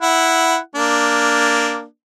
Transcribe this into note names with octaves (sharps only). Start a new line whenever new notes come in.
E4 F#5
A#3 D4